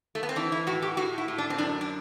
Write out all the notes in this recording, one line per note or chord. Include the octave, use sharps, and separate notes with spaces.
A3
B3
C4
E3 D4
E4
A2 F#4
G4
A2 F#4
E4
A2
D4
C4
F#2 D4
D4